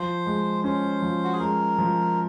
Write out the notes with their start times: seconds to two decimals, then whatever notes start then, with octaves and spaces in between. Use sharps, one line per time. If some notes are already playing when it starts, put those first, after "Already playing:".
Already playing: F3 C5
0.26 G#3
0.64 C#4 C5
1.02 F3
1.24 F#4
1.33 G#4
1.40 G#3 A#4
1.78 F3